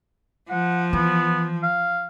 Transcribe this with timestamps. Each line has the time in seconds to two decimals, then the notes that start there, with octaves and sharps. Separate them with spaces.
0.50 F3 F#5
0.93 E3 B3
1.63 F5